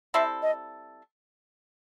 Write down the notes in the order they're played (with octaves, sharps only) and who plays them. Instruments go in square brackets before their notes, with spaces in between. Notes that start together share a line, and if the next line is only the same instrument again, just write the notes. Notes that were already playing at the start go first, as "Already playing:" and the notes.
[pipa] G3 C4 E4 A4 [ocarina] E5
[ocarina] D#5